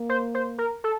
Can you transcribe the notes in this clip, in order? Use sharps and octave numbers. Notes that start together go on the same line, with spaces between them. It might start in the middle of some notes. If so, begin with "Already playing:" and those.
Already playing: A#3
C5
C5
A#4
A4